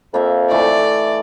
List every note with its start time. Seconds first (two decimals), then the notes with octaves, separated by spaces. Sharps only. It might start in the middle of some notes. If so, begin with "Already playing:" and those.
0.14 F2 A#3 E5
0.51 E3 A3 D5